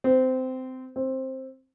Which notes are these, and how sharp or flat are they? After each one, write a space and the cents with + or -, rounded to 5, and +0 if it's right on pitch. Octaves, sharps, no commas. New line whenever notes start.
C4 -20
C4 +10